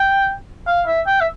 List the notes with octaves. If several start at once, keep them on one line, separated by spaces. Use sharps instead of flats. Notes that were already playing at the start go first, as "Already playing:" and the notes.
Already playing: G5
F5
E5
G5
E5